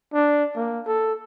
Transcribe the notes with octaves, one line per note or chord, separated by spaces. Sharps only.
D4
A#3
A4